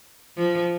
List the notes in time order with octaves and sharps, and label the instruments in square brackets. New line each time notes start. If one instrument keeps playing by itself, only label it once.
[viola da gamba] F3